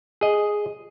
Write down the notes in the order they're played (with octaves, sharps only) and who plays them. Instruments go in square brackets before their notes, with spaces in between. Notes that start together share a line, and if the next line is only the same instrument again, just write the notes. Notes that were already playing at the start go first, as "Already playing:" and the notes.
[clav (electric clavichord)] G#4 D#5